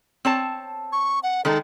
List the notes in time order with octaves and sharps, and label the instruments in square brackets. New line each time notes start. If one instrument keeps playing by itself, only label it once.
[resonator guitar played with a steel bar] C4 C#5 A5
[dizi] C#6
F#5
[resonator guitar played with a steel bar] D#3 G#3 D#4 [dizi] A4